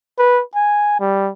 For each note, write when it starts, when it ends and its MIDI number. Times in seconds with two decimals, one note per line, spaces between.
0.18 0.42 71
0.55 0.96 80
1.00 1.31 55